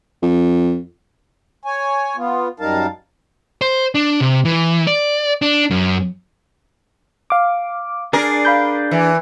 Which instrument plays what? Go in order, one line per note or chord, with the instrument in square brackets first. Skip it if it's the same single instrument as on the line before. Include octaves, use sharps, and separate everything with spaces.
[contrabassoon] F2
[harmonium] C#5 G#5
B3 F4
F#2 G3 D#4 A#4 F5 A5
[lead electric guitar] C5
D4
C3
E3
D5
D4
F#2
[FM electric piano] F5 D6
[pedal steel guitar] D4 G#4 D5 [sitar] A#4
[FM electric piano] F5 B5 G6
[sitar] E3